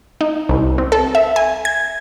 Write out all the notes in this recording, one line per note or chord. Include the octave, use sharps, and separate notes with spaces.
D#4
C2
C4
A4
E5
G#5
G#6